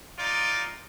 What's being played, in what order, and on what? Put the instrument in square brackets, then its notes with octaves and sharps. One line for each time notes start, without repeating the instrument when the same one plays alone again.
[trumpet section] D#4 F4 D5